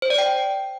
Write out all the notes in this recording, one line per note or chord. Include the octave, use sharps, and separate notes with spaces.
C5
D5
G5